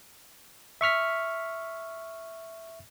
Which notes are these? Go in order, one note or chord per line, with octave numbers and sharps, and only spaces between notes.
E5 C#6 F6 B6